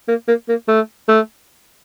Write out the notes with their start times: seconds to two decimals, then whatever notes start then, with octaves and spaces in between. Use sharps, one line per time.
0.08 A#3
0.28 A#3
0.49 A#3
0.68 A3
1.08 A3